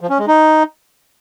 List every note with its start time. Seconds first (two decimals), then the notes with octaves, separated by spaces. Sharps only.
0.01 F3
0.10 C#4
0.19 G#3
0.28 D#4